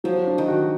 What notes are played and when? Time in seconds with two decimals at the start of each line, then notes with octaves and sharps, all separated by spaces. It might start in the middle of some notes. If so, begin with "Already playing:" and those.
0.04 F3 F#3
0.27 D4
0.38 D#3
0.48 F#4